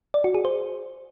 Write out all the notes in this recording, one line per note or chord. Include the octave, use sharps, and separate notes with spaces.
D5
F#4
G#4
C5